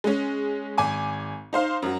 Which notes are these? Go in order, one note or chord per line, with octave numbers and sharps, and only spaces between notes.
G#3 C#4
G#1 G#5 D6
D#4 C5 F5
F#2 F#3